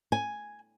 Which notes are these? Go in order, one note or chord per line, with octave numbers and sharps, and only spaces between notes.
G#5